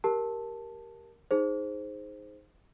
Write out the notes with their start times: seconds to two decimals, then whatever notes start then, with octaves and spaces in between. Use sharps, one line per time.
0.04 G4 A#4 A5
1.31 D#4 G#4 C5